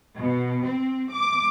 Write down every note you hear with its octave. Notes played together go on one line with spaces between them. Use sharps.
B2
C4
D6